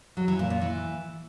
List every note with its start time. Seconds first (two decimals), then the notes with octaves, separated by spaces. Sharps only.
0.17 F#3
0.28 E3
0.39 A#2
0.50 A#2
0.61 E3